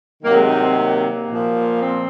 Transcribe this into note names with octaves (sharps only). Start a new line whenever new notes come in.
C3 D#3 F#3 A#3
G#3
D#4
C4
A#3
A#2 F3
C4